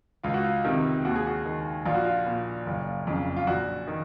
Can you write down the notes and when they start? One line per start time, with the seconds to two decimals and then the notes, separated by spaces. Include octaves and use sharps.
0.23 C#2 F4
0.34 F#4
0.44 F4
0.65 C3 D#3
1.05 D#2 F#4
1.16 G#4
1.27 F#4
1.46 D#3
1.86 A#1 F4
1.94 F#4
2.04 F4
2.26 A#2
2.66 F#1
3.07 F2 C#3
3.36 F4
3.47 A#1 F#4
3.87 D#3